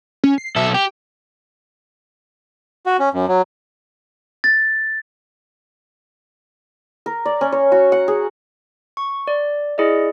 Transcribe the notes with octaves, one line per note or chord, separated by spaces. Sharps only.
C#4
C7
B1 A4 E5
G4 G5
F#4
C#4
F#2
F#3
A6
A#4
D5
C#4
C#5
F#4
F#5
G#4
C#6
D5
E4 G#4 D5 D#5